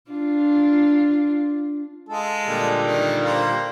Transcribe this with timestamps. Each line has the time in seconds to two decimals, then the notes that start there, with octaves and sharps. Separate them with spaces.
0.11 D4 F4
2.09 G#3 F4 A4
2.46 A#2 D3 G3
2.86 D#3
3.23 A#3 C5